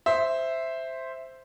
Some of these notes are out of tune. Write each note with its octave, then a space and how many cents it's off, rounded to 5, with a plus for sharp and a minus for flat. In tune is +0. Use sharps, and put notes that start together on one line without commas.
C5 +0 E5 +0